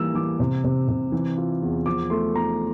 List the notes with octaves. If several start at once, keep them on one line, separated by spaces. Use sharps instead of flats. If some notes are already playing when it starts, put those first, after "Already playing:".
Already playing: E3 G3 A#3 E6
E3 D6
C3
C3
C3
E3
F4
E2
F3 D6
A3 C6
A3 A#5